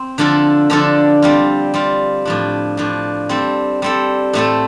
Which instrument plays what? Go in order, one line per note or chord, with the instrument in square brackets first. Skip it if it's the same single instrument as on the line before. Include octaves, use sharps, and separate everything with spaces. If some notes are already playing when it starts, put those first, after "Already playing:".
Already playing: [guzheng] C4
D3 F3 D4 F4 A4
D3 F3 D4 F4 A4
G3 C4 F4
G3 C4 F4
A2 F3 D4
A2 F3 D4
G3 C4 A4
G3 C4 A4
A2 A3 C4 A4